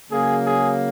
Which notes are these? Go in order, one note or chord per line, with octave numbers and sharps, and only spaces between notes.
C#3 F#3 A#3 G#4
G#4